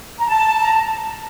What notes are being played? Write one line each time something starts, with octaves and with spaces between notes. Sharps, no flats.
A#5
A5
A#5